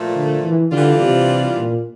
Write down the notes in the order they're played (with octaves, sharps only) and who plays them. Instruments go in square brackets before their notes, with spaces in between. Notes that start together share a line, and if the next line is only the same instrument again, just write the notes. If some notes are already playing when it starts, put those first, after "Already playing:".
Already playing: [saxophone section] A#2 F3 A3
[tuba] D3
E3
[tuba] D3 [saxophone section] E3 G3 D4 F4
[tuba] C3
A#2